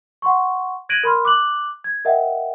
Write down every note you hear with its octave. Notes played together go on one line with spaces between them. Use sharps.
F#5 C6 C#6
F#6 G#6 A#6 D7 D#7 F#7
A#4 B5 C6 F6
D6 F#6 F#7
G#6
A#4 D#5 E5 F#5 G5